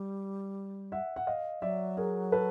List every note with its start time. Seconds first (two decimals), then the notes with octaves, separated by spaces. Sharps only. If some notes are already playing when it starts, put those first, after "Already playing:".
Already playing: G3
0.92 E5 F#5
1.16 F#5
1.27 D#5 F5
1.62 F#3 D5 E5
1.97 G#4 A#4
2.32 A4 B4